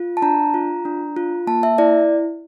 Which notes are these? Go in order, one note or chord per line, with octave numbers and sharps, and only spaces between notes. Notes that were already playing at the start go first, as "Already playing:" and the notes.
Already playing: F4
A5
D4 A#5
F4
D4
F4
A#3 A5
E5
E4 D5